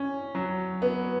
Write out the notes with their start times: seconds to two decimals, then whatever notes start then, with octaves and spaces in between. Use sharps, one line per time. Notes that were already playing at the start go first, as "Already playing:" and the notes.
Already playing: C#4
0.35 F#3
0.82 B3